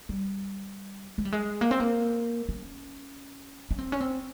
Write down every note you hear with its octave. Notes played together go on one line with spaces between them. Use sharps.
G3
G#3
G3
G#3
A#3
C4
A#3
C#4
C#4
C4
C#4
C4